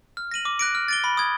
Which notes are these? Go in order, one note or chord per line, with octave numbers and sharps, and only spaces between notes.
F6
A#6 D#7 F#7
D6
F#6 A#6 D7
F6
A6 D7 G7
B5
D#6 G#6